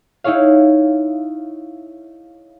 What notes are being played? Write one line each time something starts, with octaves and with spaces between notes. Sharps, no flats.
D#4 E4 G#4 C#5 F5